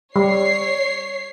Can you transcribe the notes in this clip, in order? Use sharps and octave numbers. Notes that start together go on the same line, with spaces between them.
G3 C#5 C7